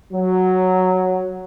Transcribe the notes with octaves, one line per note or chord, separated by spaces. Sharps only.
F#3